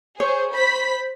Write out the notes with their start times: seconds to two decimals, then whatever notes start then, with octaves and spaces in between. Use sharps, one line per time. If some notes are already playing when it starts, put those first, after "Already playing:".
0.20 G#4 C5 C#5
0.54 C5 B5 B6